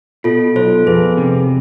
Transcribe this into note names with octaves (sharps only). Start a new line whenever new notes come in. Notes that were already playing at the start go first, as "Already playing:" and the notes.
B2 F4 A4
B1 A4 C5
F2 G#4 B4
C3